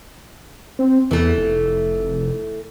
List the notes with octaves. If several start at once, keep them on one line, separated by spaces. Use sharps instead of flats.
C4
E2 E3 A3
F1